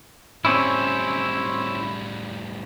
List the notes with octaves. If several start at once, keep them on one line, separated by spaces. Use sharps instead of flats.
A2 G3 C4 C#4 E4